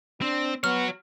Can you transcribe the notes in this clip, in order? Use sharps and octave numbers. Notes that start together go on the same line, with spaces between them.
C4 D4
B3 F#4 C#5 F6